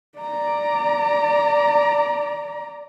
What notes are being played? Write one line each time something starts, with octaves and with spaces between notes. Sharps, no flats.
D5 A#5